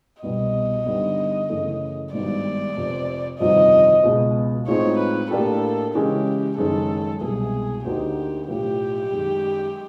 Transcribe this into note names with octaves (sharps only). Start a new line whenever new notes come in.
C2 B2 G3 B3 D#5
G2 D3 G3 B3 D#4
F#2 C#3 E3 A3
G#1 G2 D#3 G3 B3 D5
F1 F2 C3
G1 F2 C3 D#3 F#3 D#5
C#2 B2 G#3
A2 F3 G#3 C4 D#4 C#5
B4
A2 F#3 A#3 D4 G4 A4
C#3 E3 G#3 C#4 G4
F#1 F#2 D#3 G#3 A4
C2 B2 G#3 G#4
D2 D3 F#3 A#3 D#4 G4
B1 A2 F3 G4
F#2 D#3 G#3